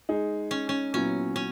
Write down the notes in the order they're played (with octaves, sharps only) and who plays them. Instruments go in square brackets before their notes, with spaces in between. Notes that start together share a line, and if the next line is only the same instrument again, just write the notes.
[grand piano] G#3 D#4 G#4
[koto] C#4
C#4
[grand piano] A#2 F#3 B3 E4 [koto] C#4
[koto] C#4